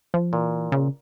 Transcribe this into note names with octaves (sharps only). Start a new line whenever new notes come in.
F3
A#2 E3
C#3